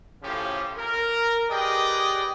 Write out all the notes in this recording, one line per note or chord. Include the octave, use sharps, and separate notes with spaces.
A2 C#3 F3 C#4 F4 G4
A#4
G4 G#4 B4 D5 D#5 G5